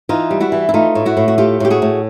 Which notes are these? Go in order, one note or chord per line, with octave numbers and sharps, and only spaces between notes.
E3 D#4 F4
G3
E4 F#4
E3
E4
A3 D#4 F4
A2
E4 F#4
A2
F#4
A3 F4 G4
A2 G4
F#4 G#4
A2